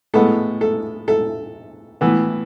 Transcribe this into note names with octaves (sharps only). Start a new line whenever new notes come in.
A2 G#3 B3 A4
A4
A4
A2 E3 B3